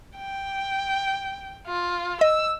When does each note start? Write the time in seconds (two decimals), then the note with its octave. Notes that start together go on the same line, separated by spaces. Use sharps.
0.18 G5
1.67 F4
2.21 D#5 E6